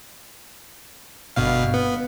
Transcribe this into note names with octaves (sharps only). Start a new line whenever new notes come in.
G1 B2 F5
B3